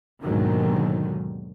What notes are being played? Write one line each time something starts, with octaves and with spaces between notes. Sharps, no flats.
D#2 G#2 B2 D3 D#3 F#3